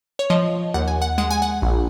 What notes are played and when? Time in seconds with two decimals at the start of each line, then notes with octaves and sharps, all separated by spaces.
0.19 C#5
0.30 F3 D#5
0.74 D#2 F#5
0.88 G#5
1.02 F#5
1.18 G#3 F#5
1.30 G#5
1.42 F#5
1.62 A#1